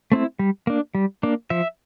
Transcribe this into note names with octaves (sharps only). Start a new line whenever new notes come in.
A3 C4 E4
G3
A#3 D4
G3
A#3 D4
F3 E5